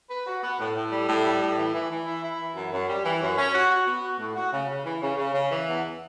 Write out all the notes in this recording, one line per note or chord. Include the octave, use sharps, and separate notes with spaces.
B4
F#4
B3
A2
A2
G3
A2
G3
A2
E3
E3
E3
E4
E4
E3
F#2
F#2
G3
E3
F#2
C#4
F#4
F#4
B3
F#4
A2
F#4
C#3
C#3
E3
C#3
C#3
C#3
E3
E2